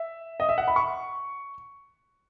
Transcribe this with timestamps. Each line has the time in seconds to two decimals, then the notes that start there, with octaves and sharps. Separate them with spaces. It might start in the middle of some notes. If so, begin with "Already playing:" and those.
Already playing: E5
0.40 D#5
0.49 E5
0.58 F#5
0.68 B5
0.76 C#6